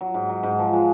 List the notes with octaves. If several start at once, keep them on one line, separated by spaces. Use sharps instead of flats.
F#3
G#2
F#3
G#2
F3
G#3